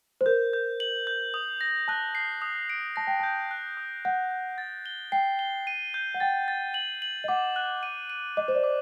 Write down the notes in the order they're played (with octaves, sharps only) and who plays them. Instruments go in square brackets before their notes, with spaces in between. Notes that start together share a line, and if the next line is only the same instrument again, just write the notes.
[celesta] C5
[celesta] A#4 [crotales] G6
[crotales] G6
F#7
G6
D#6
A#6
[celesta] A5 [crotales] F#6
[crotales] C7
D#6
D7
[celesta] A5 [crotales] A#6
[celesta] G5
[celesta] A5 [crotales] G6
[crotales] F#6
D#6
[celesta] F#5 [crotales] G6
[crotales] G6
A6
G7
[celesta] G5 [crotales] C7
[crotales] G7
D#7
G6
[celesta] F#5
[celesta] G5 [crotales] A6
[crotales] A6
F#7
F#7
[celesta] D#5
[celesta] F#5 [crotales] D6
[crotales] F#6
D#7
D#7
[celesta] D#5 [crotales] D6
[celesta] C5
D5
[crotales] D6